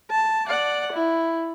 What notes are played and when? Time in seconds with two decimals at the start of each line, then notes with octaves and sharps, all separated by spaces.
0.11 A5
0.47 D5 F#5
0.93 E4